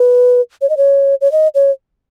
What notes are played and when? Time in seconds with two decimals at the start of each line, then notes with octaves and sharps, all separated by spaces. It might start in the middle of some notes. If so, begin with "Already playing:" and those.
Already playing: B4
0.62 C#5
0.70 D#5
0.77 C#5
1.21 C#5
1.32 D#5
1.55 C#5